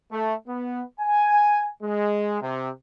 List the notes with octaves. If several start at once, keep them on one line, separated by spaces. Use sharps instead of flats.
A3
B3
G#5
G#3
C3